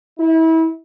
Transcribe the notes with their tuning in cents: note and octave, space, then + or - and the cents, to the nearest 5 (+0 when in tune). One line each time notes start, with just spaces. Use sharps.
E4 -30